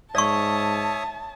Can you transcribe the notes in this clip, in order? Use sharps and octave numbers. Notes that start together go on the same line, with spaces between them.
G#2 C#5 D5 E5 A5 C#6 D#6